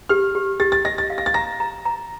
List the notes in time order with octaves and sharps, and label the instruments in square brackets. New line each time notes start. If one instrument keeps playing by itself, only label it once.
[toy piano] G4 [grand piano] F6
[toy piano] G4
[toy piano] G4 [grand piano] A6
[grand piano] A6
[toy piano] D#5 [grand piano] A#6
[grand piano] A6
[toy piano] F5
[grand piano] A#6
A6
[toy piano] A#5 [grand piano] A#6
[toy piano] A#5
A#5